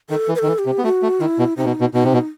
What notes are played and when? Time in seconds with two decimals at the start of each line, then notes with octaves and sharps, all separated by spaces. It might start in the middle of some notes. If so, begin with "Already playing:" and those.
0.10 D#3 A4
0.28 E3
0.35 B4
0.39 D#3 A4
0.47 E3
0.59 G4
0.66 C3
0.78 B3
0.84 A3 F#4
1.03 A3
1.20 D#3 E4
1.39 B2
1.57 C3 D#4
1.65 B2
1.81 B2
1.93 B2 D#4
2.04 C3
2.13 B2